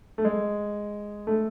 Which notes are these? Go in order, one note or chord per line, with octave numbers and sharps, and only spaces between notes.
A3
G#3
A3